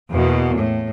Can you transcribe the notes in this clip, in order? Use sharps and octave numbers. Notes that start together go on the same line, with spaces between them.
E2 B2 A#3
A2